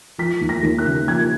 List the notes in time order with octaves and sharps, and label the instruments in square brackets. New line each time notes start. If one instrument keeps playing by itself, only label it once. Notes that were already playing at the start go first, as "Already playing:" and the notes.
[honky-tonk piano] F3 B6
D#2
A#6
D#2
F#6
C#3
F3 G#6